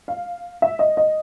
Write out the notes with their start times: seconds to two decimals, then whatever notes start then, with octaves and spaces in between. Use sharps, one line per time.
0.08 F5
0.62 E5
0.79 D#5
0.97 D#5